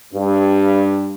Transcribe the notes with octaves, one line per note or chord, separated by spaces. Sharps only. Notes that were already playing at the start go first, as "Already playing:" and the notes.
G2